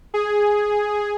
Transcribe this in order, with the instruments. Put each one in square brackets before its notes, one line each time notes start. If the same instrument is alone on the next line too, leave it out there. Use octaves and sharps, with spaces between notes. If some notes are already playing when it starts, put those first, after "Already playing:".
[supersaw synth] G#4